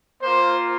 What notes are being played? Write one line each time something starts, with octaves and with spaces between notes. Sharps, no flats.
A#3 F4 C5